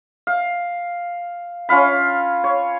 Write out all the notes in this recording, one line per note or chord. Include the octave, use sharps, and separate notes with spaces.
F5
C#4 F4 F5 B5
C#5